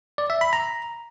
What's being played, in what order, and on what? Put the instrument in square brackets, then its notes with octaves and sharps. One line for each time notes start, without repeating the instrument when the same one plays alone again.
[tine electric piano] D5
E5
B5
A#5